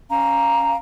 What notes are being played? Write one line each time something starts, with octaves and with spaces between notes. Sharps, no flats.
C#4 F5 A#5